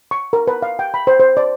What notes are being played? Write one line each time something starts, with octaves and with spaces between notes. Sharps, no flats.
C#6
A#4
B4
F5
G5
B5
C5
C5
D5